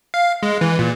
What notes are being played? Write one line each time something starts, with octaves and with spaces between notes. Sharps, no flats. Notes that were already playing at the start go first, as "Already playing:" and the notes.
F5
G#3
E3
A#2